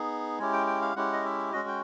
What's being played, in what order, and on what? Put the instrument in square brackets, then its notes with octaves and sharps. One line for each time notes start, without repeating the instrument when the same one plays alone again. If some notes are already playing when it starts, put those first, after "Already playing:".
Already playing: [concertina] B3 D#4 G#4
G#3 C#4 E4 G4 G#5
G5
G5
F5
G#3 C#4 E4 G4 F#5
D#5
E5
G#3 C#4 F#4 D#5
G5